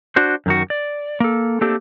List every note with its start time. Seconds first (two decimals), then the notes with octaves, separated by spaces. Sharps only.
0.16 D4 F#4 C5
0.46 F#2 D#3 F#4
0.70 D5
1.20 A#3 A4
1.61 A3 A#3 C4 D4 G4 A4